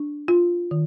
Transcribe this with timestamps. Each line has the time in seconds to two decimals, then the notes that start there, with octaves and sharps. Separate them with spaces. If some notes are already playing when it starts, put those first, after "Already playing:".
Already playing: D4
0.28 F4
0.71 D#3